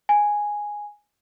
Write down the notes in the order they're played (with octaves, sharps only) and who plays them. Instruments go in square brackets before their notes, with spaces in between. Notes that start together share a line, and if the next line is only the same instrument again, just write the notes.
[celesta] G#5